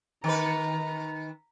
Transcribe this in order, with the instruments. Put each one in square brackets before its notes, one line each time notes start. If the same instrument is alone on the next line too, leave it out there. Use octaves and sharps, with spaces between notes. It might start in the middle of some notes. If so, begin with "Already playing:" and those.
[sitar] D#3 B4 [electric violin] A#5